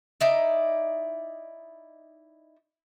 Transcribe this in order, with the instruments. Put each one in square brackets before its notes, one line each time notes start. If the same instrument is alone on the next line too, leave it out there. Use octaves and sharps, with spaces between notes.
[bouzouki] D#4 E4 D5